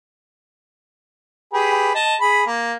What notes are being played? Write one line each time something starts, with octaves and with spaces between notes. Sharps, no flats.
G4 G#4 B4
D#5 A5
G#4 B5
A#3